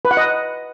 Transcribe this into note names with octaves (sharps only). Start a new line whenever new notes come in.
B4
F#5
D#5